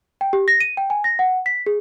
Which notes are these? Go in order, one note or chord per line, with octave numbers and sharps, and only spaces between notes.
G5
G4
A#6
D#7
G5
G#5
A#6
F#5
B6
G#4